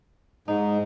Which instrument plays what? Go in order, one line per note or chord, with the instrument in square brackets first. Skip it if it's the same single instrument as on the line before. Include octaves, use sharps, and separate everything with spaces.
[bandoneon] G#2 [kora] D#4